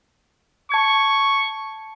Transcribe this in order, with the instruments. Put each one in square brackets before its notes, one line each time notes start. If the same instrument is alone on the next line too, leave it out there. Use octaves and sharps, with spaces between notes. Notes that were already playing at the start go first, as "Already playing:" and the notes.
[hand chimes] A5 G#6 [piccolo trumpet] C#6